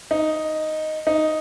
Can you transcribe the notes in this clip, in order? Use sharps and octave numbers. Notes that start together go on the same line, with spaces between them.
D#4
D#4